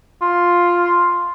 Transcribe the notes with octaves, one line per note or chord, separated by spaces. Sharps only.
F4